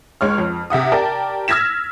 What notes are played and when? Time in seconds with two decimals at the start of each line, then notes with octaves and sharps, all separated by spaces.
0.21 C#2 G#3 C#5 F6
0.38 F2
0.70 C3 E5 F#5 D#6
0.92 G4 A#4 D5 G5 A5
1.48 E6 F6 G#6 A#6 B6 E7